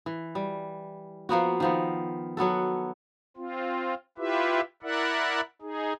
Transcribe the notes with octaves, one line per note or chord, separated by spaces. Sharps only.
E3
G3
F3 A#3 B3 F#4
D#3 F3 B3
F#3 B3 F#4 A4
C4 F4
E4 F4 G4 B4 E5
E4 A#4 D5 E5 F#5
D#4 G#4